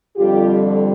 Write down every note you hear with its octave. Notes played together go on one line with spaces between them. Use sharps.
F2 D3 G3 F4 G4